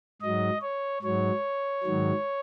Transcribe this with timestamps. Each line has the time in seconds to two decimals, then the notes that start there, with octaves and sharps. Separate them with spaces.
0.22 G#2 F#3 D#5
0.61 C#5
1.02 G#2 F#3 C#5
1.84 G#2 D#3 F#3